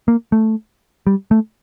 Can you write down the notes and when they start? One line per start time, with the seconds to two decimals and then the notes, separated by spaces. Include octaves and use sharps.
0.08 A#3
0.32 A3
1.07 G3
1.31 A3